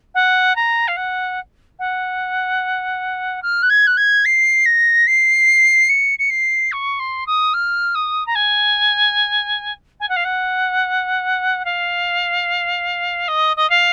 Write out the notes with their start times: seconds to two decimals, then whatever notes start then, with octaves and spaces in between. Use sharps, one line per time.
0.15 F#5
0.56 A#5
0.88 F5
0.97 F#5
1.79 F#5
3.43 F6
3.63 F#6
3.70 G#6
3.87 F#6
3.97 G#6
4.25 C7
4.66 A#6
5.07 C7
5.89 C#7
6.19 C#7
6.30 C7
6.72 C#6
6.99 C6
7.27 D#6
7.54 F6
7.95 D#6
8.26 A#5
8.35 G#5
10.00 G#5
10.09 F#5
10.16 F5
10.25 F#5
11.65 F5
13.28 D#5
13.57 D#5
13.70 F5